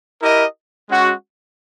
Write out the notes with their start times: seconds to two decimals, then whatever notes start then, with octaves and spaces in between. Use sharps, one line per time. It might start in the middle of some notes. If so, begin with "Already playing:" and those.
0.20 E4 G4 A#4 D#5
0.88 G#3 C#4 F#4